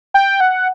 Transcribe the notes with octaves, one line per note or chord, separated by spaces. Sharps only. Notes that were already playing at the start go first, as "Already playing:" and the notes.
G5
F#5